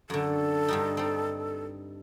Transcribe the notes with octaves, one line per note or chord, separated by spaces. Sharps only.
F#2 D3 A4
G2 G3 D#4
C4 D#4